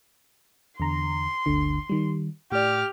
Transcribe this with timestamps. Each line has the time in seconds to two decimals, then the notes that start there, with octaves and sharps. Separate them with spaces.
0.80 E2 D3 A#5 C6
1.46 G1 D2 D3
1.89 D#3 G3
2.52 A2 G4 D5 F6